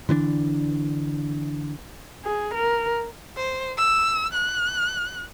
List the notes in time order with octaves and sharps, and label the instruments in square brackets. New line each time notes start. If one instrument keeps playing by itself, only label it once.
[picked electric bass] D3 E3 B3 D4
[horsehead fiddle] G#4
A#4
[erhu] C5
E6
F#6